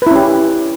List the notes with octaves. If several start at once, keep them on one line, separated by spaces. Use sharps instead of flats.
C#4 E4 G4 B4